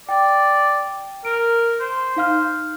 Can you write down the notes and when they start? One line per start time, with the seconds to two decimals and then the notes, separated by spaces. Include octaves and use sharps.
0.09 D5 G5
1.25 A#4 D7
1.80 C5
2.16 D#4 F5 F6